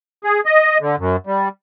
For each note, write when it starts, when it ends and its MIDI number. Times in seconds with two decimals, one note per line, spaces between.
0.24 0.40 68
0.45 0.78 75
0.81 0.96 50
0.99 1.16 42
1.27 1.49 55